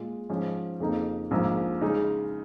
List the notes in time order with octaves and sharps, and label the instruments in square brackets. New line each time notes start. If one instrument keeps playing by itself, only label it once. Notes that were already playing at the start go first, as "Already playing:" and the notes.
Already playing: [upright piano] A#2 G#3 F4
G#2 F3 C#4
F2 C#3 A#3 D#4
A#1 G#2 F3 A#3
C#3 G#3 D#4